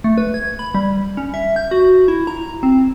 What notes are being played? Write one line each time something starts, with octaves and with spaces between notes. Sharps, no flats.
A3
B4
G#6
B5
G3
C#4
E5
G6
F#4
E4
A#5
C4